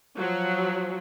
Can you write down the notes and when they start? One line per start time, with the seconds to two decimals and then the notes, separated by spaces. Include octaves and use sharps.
0.18 F3 F#3